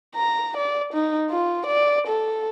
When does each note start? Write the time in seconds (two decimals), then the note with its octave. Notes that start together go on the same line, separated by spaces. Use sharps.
0.15 A#5
0.57 D5
0.93 D#4
1.30 F4
1.66 D5
2.07 A4